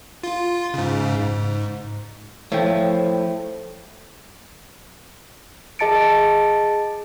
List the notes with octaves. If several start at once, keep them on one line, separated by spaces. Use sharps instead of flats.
F4
G#2 C#3
G#2
F3 A3 E4 C#5 G5
G#4 D#5 A5 A6 C#7 D7